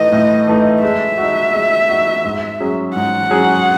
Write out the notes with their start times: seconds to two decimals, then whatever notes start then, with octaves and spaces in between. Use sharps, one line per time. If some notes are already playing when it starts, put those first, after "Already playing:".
Already playing: A2 E3 A3 D#4 D#5
0.12 A2
0.47 E3 A3 D#4
0.82 G#3 E5
1.18 D#4 F#4
1.54 G#3
1.89 D#4 F#4
2.24 G#2
2.60 F#3 C#4 G#4
2.95 G#2 F#5
3.31 F#3 C#4 G#4